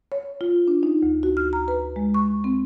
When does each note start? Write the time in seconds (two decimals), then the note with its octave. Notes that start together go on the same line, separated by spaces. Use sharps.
0.12 C#5
0.41 F4
0.68 D4
0.83 D#4
1.03 D2
1.23 F#4
1.37 F6
1.53 A#5
1.68 B4
1.96 G#3
2.14 C#6
2.44 C4